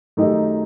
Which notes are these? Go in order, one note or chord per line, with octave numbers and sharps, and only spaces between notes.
F#2 D#3 A3 D#4 G4